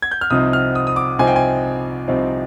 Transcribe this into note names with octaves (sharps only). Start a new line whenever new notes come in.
G#6
G6
F6
C2 C3 F3 C4 D#4 D#6
F6
D#6
D#6
D6
C2 C3 F3 C4 D#4 G#5
G5
G#5
C2 C3 F3 C4 D#4